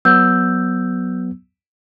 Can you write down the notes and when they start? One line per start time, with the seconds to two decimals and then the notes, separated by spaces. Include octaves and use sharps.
0.05 F#3 B3 E6 G6